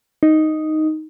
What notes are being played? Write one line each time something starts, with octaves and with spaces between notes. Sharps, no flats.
D#4